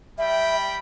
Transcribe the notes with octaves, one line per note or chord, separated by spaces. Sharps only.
G3 E5 G5 B5